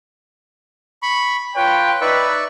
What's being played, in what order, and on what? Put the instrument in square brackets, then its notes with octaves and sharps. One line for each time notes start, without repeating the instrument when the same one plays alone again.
[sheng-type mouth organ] B5 C#6
[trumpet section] F4 C#5 G5 [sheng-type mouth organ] B4
[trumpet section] D#4 B4 [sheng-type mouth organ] D5 E5 C#6